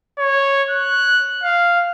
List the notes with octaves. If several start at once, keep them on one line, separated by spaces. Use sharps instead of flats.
C#5
F#6
F5